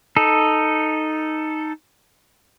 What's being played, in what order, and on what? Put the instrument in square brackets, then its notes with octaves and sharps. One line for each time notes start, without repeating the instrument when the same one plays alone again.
[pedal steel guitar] D#4 A4